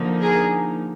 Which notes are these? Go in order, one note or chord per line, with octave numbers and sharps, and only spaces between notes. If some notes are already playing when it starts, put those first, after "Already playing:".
Already playing: D3 F3 A#3 D#4
G#4 A#4